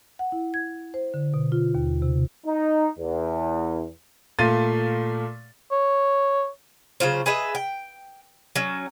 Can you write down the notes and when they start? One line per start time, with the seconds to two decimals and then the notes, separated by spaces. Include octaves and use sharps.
0.19 F#5
0.32 E4
0.54 G#6
0.94 C5
1.14 D3
1.34 B2
1.52 F4
1.75 D#2
2.02 C3
2.46 D#4
2.99 E2
4.39 A#2 A3 F5 A6 D#7
5.72 C#5
7.00 C#3 F#3 F4 C5
7.26 G#4 B4 D#5 E5
7.55 G5
8.56 F#3 C#4